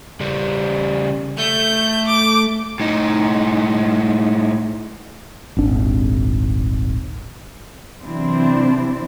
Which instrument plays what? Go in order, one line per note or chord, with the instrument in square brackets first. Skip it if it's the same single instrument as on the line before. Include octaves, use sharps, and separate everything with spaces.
[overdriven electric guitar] C#3 G3
[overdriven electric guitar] A3 [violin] G6
[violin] D6
[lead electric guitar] A2 D#4
[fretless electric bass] D#1 G#1 D4
[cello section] C3 E3 F#3 C4 D4 E4